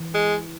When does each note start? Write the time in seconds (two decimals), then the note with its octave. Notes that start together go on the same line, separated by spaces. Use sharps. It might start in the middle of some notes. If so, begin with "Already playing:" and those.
Already playing: E3
0.14 G#3